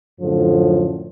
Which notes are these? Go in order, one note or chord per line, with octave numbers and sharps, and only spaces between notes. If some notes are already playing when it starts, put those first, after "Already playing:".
F#2 A2 D3 F3